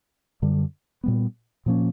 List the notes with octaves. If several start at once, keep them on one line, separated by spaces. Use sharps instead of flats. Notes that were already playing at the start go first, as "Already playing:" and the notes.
F#2 D3 G3
A#2 G3 B3
A#2 F3 A#3 C#4